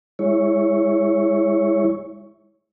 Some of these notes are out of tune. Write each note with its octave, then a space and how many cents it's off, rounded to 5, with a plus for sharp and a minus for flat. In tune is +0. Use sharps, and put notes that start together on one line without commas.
G#3 -20 E4 +0 C#5 +0